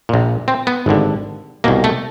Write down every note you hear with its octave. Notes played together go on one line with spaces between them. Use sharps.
A#1 A#2
C4
B3
G#1 G2 D3
C2 B2 A#3
A3